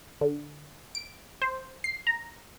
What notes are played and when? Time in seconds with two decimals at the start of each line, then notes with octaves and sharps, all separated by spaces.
0.21 D3
0.95 D7
1.42 C5
1.84 C7
2.07 A#5